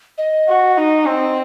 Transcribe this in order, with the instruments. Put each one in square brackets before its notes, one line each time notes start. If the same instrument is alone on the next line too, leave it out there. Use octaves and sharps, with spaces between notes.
[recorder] D#5
[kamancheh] F#4
D#4
C4